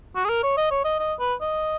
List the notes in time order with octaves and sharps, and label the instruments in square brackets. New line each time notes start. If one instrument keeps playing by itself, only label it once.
[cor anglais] F#4
G#4
A#4
C#5
D#5
C#5
D#5
D#5
B4
D#5